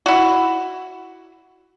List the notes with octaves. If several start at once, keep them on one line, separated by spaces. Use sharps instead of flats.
E4 F#4